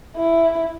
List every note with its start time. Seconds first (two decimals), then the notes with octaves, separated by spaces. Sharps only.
0.16 E4